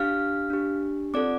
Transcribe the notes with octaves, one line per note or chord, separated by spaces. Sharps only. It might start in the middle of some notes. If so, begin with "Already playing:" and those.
Already playing: D4 G4 F5 F6
D4 G4
C4 F4 A4 D5 D6